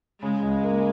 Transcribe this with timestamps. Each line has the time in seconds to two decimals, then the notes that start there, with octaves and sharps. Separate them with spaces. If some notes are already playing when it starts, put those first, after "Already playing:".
0.22 C#3 G#3
0.42 C#2
0.64 A#3